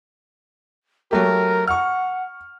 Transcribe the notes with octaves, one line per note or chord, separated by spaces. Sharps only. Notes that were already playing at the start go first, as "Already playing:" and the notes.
F#3 A3 G4 A#4
F#5 C#6 F6